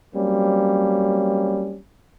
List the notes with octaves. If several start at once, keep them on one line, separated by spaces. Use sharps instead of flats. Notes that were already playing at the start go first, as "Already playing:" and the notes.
F#3 G3 A#3 C4 C#4